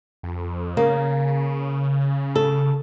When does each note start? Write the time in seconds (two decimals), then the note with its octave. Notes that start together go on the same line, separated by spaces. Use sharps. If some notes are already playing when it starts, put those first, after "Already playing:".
0.23 F2
0.77 C#3 A#3
2.36 A4